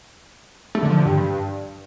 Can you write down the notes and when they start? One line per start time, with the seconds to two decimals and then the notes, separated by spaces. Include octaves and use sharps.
0.75 A3
0.82 D3
0.90 F3
0.97 D3
1.05 G2